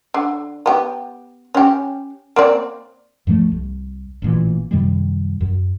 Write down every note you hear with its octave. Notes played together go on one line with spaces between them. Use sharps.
D3
B3 G4
C#4 G4
A#3 C4 D5
G2 F3 A3
C2
A1 A#2 E3
F#2 C3 D#3 G3
F#2